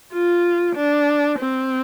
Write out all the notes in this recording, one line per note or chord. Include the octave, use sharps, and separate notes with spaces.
F4
D4
C4